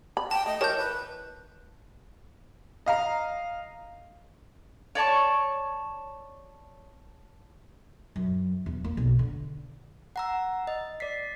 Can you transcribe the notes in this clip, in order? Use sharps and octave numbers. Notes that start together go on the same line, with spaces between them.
B5
G5 A5
A3 D#5
E3 A#4 C#5 A5 G6
B4
D#5 F5 A#5
C#5 D5 A5 C#6
F#2
E2
A#3
B1
D3
F#5 A#5 E6
D#5
D5 B6 C7